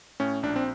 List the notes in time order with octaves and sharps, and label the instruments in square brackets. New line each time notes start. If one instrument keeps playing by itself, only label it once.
[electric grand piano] A2 C#4
A#1 D4
C4